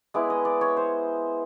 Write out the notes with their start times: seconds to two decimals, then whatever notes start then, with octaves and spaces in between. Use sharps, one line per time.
0.14 G#3 B3 E4 D5
0.30 D#5
0.45 D5
0.61 C#5
0.77 C5